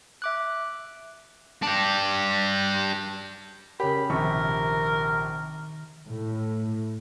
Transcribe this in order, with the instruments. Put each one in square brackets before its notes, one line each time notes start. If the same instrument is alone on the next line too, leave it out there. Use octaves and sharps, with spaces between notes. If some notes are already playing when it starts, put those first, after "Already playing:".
[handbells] E5 D6 F#6
[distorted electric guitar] D4 G4
[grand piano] C#3 G4 [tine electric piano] A#4 C#5 [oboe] B5
[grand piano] A#1 C3 C#6 [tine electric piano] D#3 [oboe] A#4
[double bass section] A2